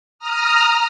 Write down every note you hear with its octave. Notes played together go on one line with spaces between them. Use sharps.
A#5 D#6 F6